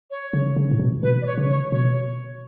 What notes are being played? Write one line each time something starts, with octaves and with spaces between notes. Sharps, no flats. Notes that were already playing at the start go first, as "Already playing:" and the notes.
C#5
C#3
C#3
A2
B2
B2 B4
D5
C#5
C#3
C#5
B2 C#5